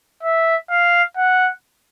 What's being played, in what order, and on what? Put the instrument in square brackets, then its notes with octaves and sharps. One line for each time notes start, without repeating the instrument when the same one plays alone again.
[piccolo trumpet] E5
F5
F#5